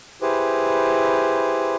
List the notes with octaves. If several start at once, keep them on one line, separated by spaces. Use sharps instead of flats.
E4 G4 G#4 B4 C5